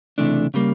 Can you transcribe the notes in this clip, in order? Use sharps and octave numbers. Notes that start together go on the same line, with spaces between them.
C#2 C3 E3 A3 D4
C#3 E3 G3 A#3